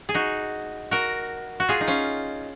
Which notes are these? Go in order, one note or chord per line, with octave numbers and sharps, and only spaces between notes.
G#4
D#4 F#4
F#4 A#4
F#4
F4 G#4
D#4
C#4 F4